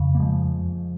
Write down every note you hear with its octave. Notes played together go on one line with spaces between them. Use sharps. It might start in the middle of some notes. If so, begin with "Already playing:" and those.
Already playing: F2 C#3
A#3
F3 G#3